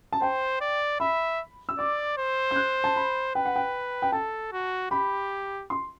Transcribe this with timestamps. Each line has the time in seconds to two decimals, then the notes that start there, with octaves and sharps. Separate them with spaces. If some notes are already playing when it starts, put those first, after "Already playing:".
0.13 A5
0.22 C5 G5
0.61 D5
1.00 E5 B5
1.69 E6
1.78 D5 D6
2.18 C5
2.51 G6
2.56 F#6
2.84 A5
2.96 B5
3.35 B4 G5
3.45 F#5
3.56 G5
4.02 G5
4.12 A4 A5
4.52 F#4
4.91 G4 B5
5.70 C6